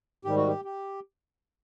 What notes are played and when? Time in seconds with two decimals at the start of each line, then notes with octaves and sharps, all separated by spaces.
0.25 G#2 D#3 G3 G4
0.37 F#4
0.47 G4
0.65 G4